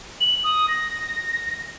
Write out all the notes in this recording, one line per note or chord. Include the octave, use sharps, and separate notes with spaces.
F#7
D#6
A#6